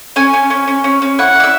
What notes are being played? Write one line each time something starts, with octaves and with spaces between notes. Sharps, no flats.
C#4 G#5
C#4
C#4
C#4
C#4
C#4
E4 F#5
E4 D5
E5